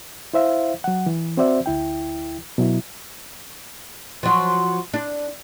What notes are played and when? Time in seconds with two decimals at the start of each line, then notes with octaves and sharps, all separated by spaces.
0.34 E4 C5 E5 F5
0.84 F#3 F#5
1.06 E3
1.37 C4 F#4 C5 D5 E5
1.66 D2 E4 G5
2.58 B2 F#3 E4
4.23 F3 F#3
4.94 D4